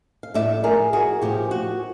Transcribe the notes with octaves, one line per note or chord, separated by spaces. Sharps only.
F5
A2 F3 A3 D5 E5
G#4 A#4
F#4 G#4
A2 F3 A3 F4 G4
F#4